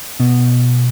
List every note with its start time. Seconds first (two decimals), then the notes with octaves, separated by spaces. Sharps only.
0.20 B2